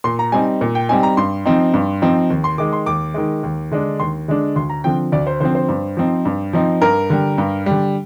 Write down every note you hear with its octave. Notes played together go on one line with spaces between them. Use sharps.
A#2 C6
A#5
G3 C4 D#4 G#5
A#2
G5
G3 C4 D#4 G#5
A#5
G2 C6
F3 C4 D#4
G2
F3 C4 D#4
D#2
C6
D#3 G#3 D6
C6
D#2 D6
D#3 G#3
D#2
D3 G#3 D4
D#2 C6
D3 G#3 D4
D2 C6
A#5
D3 F3 C4 G5
D2 D5
C5
D3 F3 C4 C5
C5
G2
F3 C4 D#4
G2
F3 C4 D#4
G2 A#4
D3 G3
G2
D3 G3